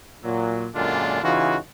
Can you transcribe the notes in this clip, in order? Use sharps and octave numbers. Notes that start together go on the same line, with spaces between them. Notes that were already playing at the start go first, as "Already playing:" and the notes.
A#2 F#3
F#2 A#2 D3 G#3 D4 F4
C#3 E3 D#4 F4 F#4